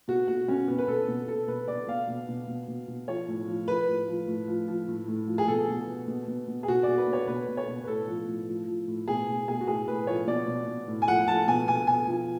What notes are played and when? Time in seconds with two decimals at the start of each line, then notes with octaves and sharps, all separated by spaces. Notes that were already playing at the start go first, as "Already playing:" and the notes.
0.08 B2 F#4
0.28 B2 F#4
0.48 B2 C#4
0.68 B2 B3
0.78 B4
0.88 B2 A4
1.08 B2
1.28 B2 A4
1.48 B2 B4
1.68 B2 D5
1.88 B2 F5
2.08 B2
2.29 B2
2.48 B2
2.68 B2
2.88 B2
3.08 F3 C#5
3.28 A2
3.48 F3
3.68 F3 B4
3.88 A2
4.08 F3
4.28 A2
4.48 F3
4.68 F3
4.88 A2
5.08 A2
5.28 F3
5.38 G#4
5.48 B2 A4
5.68 B2
5.88 B2
6.08 B2
6.28 B2
6.48 B2
6.63 G#4
6.68 B2 F#4
6.83 B2 D5
6.98 B4
7.08 B2
7.13 C#5
7.27 B2 B4
7.48 B2
7.57 C#5
7.68 B2
7.84 B4
7.87 A2 A4
8.08 F3
8.28 A2
8.48 F3
8.68 F3
8.88 A2
9.08 B2 G#4
9.28 B2
9.48 B2 G#4
9.61 F#4
9.67 A2 G#4
9.88 A2 B4
10.07 F3 C#5
10.27 B2 D5
10.48 B2
10.68 B2
10.88 A2
11.02 G#5
11.07 F3 F#5
11.27 F3 A5
11.48 B2 G#5
11.68 B2 G#5
11.87 B2 G#5
12.08 F3